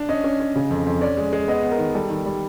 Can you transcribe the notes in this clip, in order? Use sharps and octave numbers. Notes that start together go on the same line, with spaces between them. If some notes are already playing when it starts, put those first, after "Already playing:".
Already playing: D4
C#4 D#5
C#4
C#4
C#3
F2
F2
C#4 D5
G#3
G#3
B3 D#5
B3
A#4
D#3
G3 A4
D#3
G3